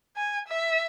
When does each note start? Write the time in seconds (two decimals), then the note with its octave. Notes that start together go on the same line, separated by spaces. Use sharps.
0.16 G#5
0.48 E5